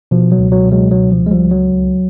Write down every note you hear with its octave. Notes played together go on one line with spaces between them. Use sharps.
B2 F3
F#3
C#2
F#3
B2
F#3 G#3
C#2 F#3
F3
C#2
G#3
F3 G3
C#2
F#3
C2